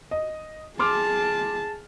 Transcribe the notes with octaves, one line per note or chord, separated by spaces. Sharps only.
D#5
G#4 A5 C6 D6 F6